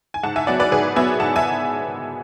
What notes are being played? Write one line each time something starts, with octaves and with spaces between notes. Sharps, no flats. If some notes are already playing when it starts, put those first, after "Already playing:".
G#5
G#2 F#5 A5
E5 G#5
F#3 B3 D5 F#5
B4 D5
G#2 G#4 B4
F#3 B3 E5 G#5
G#2 F#5 A5
E5 G#5